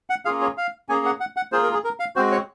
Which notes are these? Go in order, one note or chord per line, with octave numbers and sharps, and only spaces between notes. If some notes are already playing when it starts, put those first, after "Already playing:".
F#5
A#3 C#4 F4 G#4 F5
C#5
F5
A#3 C#4 G#4 G#5
F#5
F#5
F#5
A#3 F4 G#4 C5
A#4
G#4
A#4
F5
G#3 C4 F#4 C5
C#5